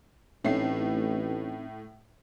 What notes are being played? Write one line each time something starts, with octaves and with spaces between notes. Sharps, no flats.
A1 A2 A3 C4 C#4 D#4 C7